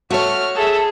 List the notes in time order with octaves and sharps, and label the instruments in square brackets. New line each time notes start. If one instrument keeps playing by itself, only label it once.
[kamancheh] A3 F6 [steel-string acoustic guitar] F#4 C#5
[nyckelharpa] G#4 [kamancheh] A4 E5